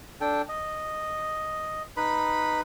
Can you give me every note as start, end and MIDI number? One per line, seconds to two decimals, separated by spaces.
0.21 0.42 62
0.21 0.42 69
0.21 0.42 79
0.49 1.82 75
1.97 2.61 63
1.97 2.61 71
1.97 2.61 83